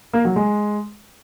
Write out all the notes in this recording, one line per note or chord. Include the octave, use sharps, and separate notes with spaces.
A#3
F#3
G#3